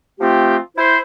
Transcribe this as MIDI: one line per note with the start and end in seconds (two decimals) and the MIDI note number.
0.20 0.57 53
0.20 0.57 57
0.20 0.57 60
0.20 0.57 65
0.20 0.57 67
0.76 0.98 64
0.76 0.98 72